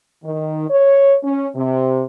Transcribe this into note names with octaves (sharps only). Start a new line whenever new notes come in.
D#3
C#5
C#4
C3